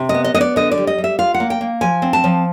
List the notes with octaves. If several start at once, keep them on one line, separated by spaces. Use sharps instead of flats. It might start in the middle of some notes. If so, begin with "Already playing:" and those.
Already playing: C3
D#5
B3
D#5
B3 D#5
D5
D3 D#5
D5
G3
D#5
G3
E5
F4 F5
F#5
A#3
G5
A#3
F3 G#5
C4
A5
F3